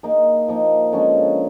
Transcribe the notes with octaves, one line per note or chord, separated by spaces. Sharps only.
A#3 D#4 G#4
F3 A#3 D#4
D3 F3 G#3 C#4